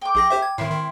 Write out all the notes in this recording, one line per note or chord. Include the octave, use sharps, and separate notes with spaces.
G5 D6
A#1 G#4 A#6
G4 C5 E5
G#6
A2 D#3 C4 E4 C6
D#3